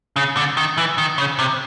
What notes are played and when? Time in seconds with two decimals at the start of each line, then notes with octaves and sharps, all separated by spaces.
0.16 C#3
0.37 D3
0.57 D#3
0.77 E3
0.98 D#3
1.18 C#3
1.39 C3